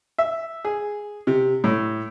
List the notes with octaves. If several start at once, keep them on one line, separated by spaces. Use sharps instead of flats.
E5
G#4
C3
A2